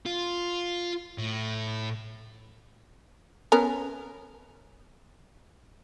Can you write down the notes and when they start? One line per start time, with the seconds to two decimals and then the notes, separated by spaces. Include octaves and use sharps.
0.06 F4
1.18 A2
3.52 B3 C#4 A#4